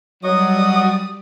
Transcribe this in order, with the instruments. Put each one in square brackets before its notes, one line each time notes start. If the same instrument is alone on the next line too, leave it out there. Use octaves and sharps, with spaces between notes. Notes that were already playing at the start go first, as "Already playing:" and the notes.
[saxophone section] F#3 [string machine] G3 D5 [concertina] F#4 D#5 C#6 [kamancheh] D#6